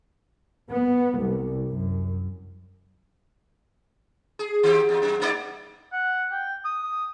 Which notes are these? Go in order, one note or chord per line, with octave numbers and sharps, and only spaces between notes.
B3
C2
F#2
G#4
D#3 C4 G4
E2
F#2
A3 D#4 D5
F#5
G5
D#6